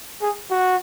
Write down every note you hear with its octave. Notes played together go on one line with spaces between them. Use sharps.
G#4
F#4